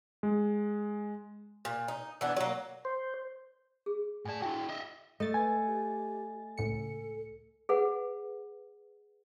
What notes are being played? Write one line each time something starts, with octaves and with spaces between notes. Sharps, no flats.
G#3
A#2
D#4
E3 B3 D4
F#3 A#3
C5
G#4
A2 D5 G#5 A5
E4 F#4 G5
D#5 E5
A3 D#5 A6
B4 G#5
G4
C#2 A2 A4 C#7
G#4 B4 F#5